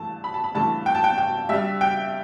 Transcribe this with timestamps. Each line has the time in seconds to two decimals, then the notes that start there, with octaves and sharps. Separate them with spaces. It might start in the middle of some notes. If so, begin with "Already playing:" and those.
Already playing: G2 E3 A3 A5
0.24 B5
0.34 A5
0.44 B5
0.55 G2 E3 A3 A5
0.86 G5
0.95 A5
1.04 G5
1.18 G5
1.49 G2 G3 E5
1.81 G5